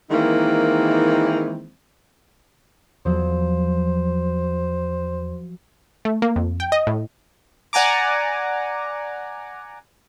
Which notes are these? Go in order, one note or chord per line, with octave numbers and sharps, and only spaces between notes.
D#3 E3 G#3 A#3 C4 E4
E2 F3 F#3 C5
A3
A#3
F2
G5
D#5
A2
D5 F#5 G#5 A#5 D6